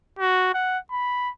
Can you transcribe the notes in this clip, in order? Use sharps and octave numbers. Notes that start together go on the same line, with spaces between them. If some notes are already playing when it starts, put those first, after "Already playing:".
F#4
F#5
B5